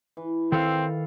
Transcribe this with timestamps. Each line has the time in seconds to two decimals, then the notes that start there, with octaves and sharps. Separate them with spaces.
0.17 E3
0.52 D#3 C4 A4 F5